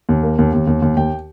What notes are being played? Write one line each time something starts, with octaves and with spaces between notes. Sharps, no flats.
D#2
A#3
D#2
D#2
D#2
D#2
D#2 G5